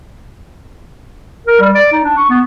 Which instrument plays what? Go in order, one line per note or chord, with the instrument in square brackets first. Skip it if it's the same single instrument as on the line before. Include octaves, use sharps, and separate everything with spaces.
[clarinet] A#4
G3
D5
D#4
D4
C#6
B3